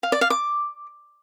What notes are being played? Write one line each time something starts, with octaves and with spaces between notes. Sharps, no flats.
F5
D5
F5
D6